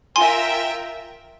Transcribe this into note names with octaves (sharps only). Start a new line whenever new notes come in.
F4 A#4 E5 G5 G#5 C6